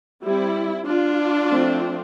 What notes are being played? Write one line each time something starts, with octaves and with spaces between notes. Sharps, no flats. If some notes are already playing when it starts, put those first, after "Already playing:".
G3 C4 E4
D4 F4
F3 A3 C4